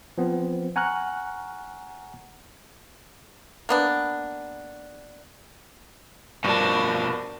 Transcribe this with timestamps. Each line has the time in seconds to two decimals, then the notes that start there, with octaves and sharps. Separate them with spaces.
0.18 F3 B3 C4
0.76 F#5 G#5 A#5 C#6 F6 F#6
3.69 A#3 B3 D4
6.44 G2 B2 F3 D4 A#4